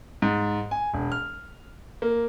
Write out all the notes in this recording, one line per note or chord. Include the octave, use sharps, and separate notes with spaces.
G#2
G#5
E1
F6
A#3